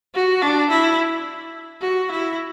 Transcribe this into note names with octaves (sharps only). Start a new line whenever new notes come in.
F#4
D4
E4
F#4
E4